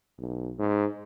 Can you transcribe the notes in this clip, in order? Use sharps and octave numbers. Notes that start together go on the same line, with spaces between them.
B1
G#2